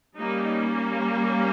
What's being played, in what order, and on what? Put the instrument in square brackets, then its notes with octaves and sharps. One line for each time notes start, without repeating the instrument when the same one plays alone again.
[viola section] G3 A#3 C#4 D#4